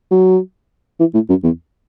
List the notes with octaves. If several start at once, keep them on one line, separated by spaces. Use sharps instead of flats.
F#3
E3
A2
F#2
E2